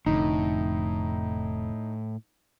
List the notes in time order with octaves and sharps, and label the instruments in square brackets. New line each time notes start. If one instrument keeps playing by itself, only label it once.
[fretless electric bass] F1 F2 D3 [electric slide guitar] A2 [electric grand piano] D#4